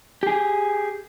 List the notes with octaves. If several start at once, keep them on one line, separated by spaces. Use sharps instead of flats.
G4 G#4